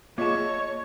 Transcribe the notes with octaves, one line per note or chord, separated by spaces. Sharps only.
A#3 F4 G#4 C#5 D#5 E5 A5